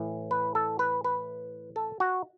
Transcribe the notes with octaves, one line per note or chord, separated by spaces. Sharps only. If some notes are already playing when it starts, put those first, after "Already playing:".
Already playing: A2 E3
B4
A4
B4
B4
A4
F#4